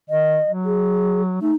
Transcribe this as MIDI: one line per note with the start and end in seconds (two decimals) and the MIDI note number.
0.09 0.39 51
0.09 0.51 75
0.46 1.38 54
0.65 1.21 68
1.41 1.52 57
1.41 1.55 63